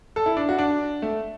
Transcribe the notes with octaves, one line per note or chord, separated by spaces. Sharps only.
A4
E4
D4
F#4
D4
A3